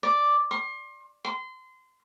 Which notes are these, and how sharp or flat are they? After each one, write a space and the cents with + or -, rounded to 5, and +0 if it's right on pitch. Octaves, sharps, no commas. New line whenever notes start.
D5 +0
C6 +35
C6 -25